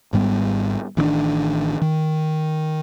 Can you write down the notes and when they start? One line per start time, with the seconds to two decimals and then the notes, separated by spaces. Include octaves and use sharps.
0.13 G#1 G#2 G3 B3
0.97 A1 D#3 G#3 D4
1.82 D#3